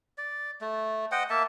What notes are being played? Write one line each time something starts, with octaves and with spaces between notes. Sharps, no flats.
D5
A3
C5 D#5 F#5 G5
A#3 E5 A5